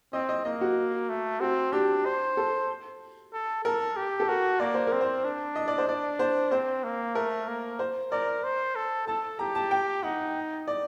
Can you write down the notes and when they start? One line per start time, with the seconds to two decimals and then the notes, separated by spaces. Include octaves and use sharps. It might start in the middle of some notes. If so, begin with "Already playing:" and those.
0.13 C4 D#5
0.29 D#5
0.45 A#3 D#5
0.61 F#4
1.09 A3
1.40 C4 F#4
1.73 D4 G4
2.05 C5
2.37 A4
3.33 A4
3.65 A4 A#4
3.96 G4
4.20 A4
4.28 F#4 A#4
4.60 A#3 D5
4.74 C5
4.87 A#4
4.93 C4
5.01 C5
5.25 D4
5.56 D#5
5.68 D5
5.78 C5
5.88 D4 D5
6.19 C5
6.52 C4 C5
6.84 A#3
7.15 A3 A#4
7.48 A#3
7.79 C5
8.11 A#4 D5
8.44 C5
8.76 A4
9.07 A4 A5
9.39 G4 A#5
9.55 A5
9.71 G5
10.03 D#4 F#5
10.68 D5